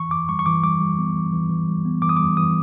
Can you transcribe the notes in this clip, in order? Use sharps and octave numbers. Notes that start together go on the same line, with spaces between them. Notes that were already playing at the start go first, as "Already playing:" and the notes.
Already playing: E3 C#6
E3 D6
G3 C#6
C#6
E3 D6
G3 D6
G3
B3
E3
E3
E3
G3
B3
E3 D6
D#6
G3 D6
E3 D#6